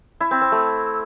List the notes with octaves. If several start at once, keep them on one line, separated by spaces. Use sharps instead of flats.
E4
C4
C4
A3